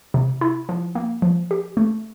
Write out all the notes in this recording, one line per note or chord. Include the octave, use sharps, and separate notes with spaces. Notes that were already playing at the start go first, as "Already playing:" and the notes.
C3
E4
F3
A#3
F3
G4
A3